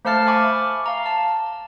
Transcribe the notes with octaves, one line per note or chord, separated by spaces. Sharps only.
A3 C5 F5 A5 F6 A6
E5 G#5 B5 C#6 D6
F5 A#5
A5